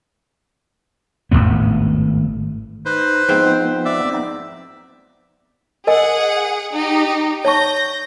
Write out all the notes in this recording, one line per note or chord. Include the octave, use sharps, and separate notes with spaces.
G#1 F#2 A2 B3
D#4 B4 C5
G#2 F3 B3 C4 F5
D5 E5
B3 C4 D#4
G#4 A#4 D#5 F#5 G#5
D#4 G4
C#5 A5 C#6 G6 A#6